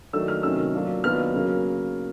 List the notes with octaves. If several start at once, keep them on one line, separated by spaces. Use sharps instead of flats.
D#3 F#3 A3 D4 E6
F6
C3 D#3 F#3 A3 C#4 E6
F#3 A#3 D4 F4
D#3 F#3 B3 D4 F4 F6
C#3 F#3 A#3